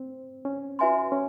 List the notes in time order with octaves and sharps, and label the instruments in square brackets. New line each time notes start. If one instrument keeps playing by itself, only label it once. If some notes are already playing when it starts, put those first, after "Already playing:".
Already playing: [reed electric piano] C4
C#4
[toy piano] F#4 B4 E5 G#5 C6
[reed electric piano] C#4